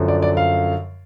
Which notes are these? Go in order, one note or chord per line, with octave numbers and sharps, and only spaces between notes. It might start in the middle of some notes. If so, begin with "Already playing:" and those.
Already playing: F#2 D3 F3
D5
D5
F5